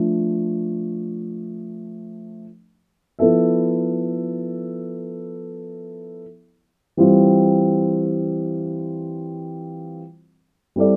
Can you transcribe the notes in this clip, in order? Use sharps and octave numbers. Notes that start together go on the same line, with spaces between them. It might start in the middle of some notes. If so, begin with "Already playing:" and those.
Already playing: F3 A3 D4
F3 B3 E4 A4 E5
E3 G3 C4 F4
G3 C4 E4 A4 D5